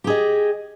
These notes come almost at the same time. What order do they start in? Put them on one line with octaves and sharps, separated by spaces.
G4 G#4 D#5